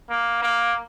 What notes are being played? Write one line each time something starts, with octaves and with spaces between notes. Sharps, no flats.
A#3
A#3